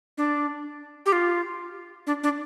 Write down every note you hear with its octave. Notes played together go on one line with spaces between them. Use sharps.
D4
G4
F4
D4
D4